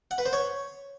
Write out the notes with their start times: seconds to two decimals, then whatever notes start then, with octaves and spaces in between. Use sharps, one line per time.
0.11 F#5
0.18 B4
0.26 C5
0.33 C#5